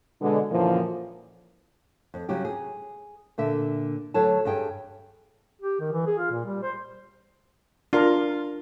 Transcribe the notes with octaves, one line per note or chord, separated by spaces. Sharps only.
B2 D3 G#3
F#2 A#2 D3 E3 F3
F2
C#3 F#3 G3 G4
G#4
A#2 D3 E5
D2 F#3 A4 C#5 A5
G2 G3 G#4 G5
G4
D#3
E3
G#4
F4
A#2
G3
C5
D4 F4 A#4